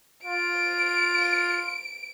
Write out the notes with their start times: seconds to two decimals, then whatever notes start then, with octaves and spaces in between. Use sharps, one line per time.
0.25 F4 D7